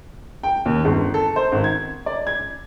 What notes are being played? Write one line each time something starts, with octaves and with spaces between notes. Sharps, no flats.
G5
D#2
G1
A4
C5
G#1
G#6
D5
G#6